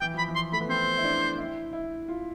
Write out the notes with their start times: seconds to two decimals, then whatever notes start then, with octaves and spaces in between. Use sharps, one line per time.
0.01 E3 G5
0.14 F3 B5
0.28 E3
0.35 C6
0.52 A3 B5
0.61 B3
0.69 C4 C5
0.97 E4
1.05 D4
1.38 E4
1.73 E4
2.08 F4